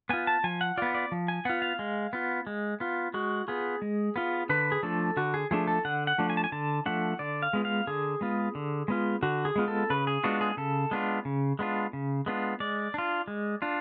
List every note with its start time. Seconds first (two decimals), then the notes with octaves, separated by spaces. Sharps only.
0.09 B3 F4 G#5
0.27 A5
0.44 F3 G#5
0.61 F#5
0.77 B3 F4 D5
0.95 D5
1.12 F3
1.28 G#5
1.45 B3 F4 F#5
1.62 F5
1.79 G#3
2.13 B3 F4
2.47 G#3
2.80 B3 F4
3.14 G#3 F#4
3.48 B3 F4 G#4
3.82 G#3
4.16 B3 F4
4.49 D3 B4
4.72 G#4
4.83 F3 A3 D4 A4
5.17 D3 F#4
5.34 G#4
5.51 F3 A3 D4 G#4
5.67 A4
5.85 D3 F#5
6.07 F#5
6.18 F3 A3 D4
6.30 G#5
6.37 A5
6.44 G#5
6.52 D3 A5
6.86 F3 A3 D4 F#5
7.19 D3 D5
7.42 F5
7.53 G#3 B3 F4
7.65 F5
7.87 D3 G#4
8.21 G#3 B3 F4
8.55 D3
8.88 G#3 B3 F4
9.23 D3 F#4
9.45 G#4
9.56 G#3 B3 F4
9.68 A4
9.90 C#3 B4
10.07 G#4
10.24 G#3 B3 D4 F4 F#4
10.41 G#4
10.57 C#3 A4
10.91 G#3 B3 D4 F4
11.25 C#3
11.59 G#3 B3 D4 F4
11.93 C#3
12.26 G#3 B3 D4 F4
12.60 G#3 D5
12.94 D4 F4
13.28 G#3
13.62 D4 F4